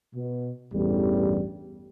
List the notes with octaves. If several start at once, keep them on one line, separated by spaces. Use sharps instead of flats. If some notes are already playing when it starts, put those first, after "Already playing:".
B2
A1 E2 G2 G3